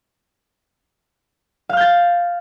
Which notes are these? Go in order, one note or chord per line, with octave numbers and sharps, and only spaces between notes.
F5 F6 G6 A6